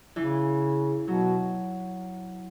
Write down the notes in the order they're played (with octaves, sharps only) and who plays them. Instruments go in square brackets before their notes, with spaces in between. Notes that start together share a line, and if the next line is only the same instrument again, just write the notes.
[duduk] C#3 [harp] E3
[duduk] B2 [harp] F#3